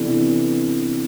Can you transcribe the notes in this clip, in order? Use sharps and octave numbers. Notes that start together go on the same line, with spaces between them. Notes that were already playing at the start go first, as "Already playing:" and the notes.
Already playing: C3 E3 B3 D4 A4